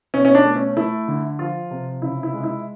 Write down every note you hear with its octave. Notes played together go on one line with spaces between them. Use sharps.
B2 C#4
C#4
D4
A3
C#4
A3 E4
D3
F3 F4
C3
C#3 E4
E4
G#3
E4